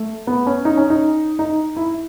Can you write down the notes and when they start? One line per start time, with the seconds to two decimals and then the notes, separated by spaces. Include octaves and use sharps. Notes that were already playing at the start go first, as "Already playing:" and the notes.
Already playing: A3
0.27 B3
0.47 C#4
0.65 D#4
0.77 C#4
0.90 D#4
1.39 D#4
1.77 E4